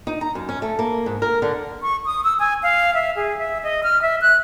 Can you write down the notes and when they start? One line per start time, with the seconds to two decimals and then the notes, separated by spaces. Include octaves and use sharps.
0.07 D#4
0.21 A#5
0.35 F#2
0.49 C#4
0.62 A3
0.79 A#3
1.06 G#2
1.22 A#4
1.42 D3
1.82 C#6
2.06 D#6
2.24 E6
2.39 G#5
2.63 F5
2.94 E5
3.16 G#4
3.39 E5
3.63 D#5
3.83 F6
4.02 E5
4.22 F#6